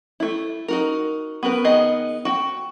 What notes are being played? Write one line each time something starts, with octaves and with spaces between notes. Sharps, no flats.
A3 E4
D#4 F#4 A#4
B3 F#4 A#4 B4
D#3 B3 G#4 D#5
F#4 G5